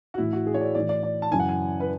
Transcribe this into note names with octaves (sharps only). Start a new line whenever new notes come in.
F#4
A2 E3 E4
F#4
G#4
C#5
D5
A2 E3 D5
D5
D5
A5
F#2 C#3 E3 G#5
F#5
G#5
B4